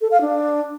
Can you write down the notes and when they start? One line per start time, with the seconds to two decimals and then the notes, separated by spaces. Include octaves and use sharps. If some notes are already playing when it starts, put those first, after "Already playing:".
0.01 A4
0.11 F5
0.21 D4